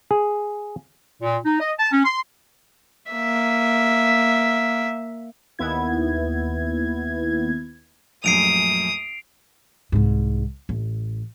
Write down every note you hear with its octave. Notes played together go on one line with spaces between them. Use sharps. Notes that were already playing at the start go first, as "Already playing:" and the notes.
G#4
A#2
D#4
D#5
A5
C#4
C6
A#3 E5
D#2 B3 E4 G#6
A#1 F#2 A3 D#6 C7 D7 F7
C2 G#2
A1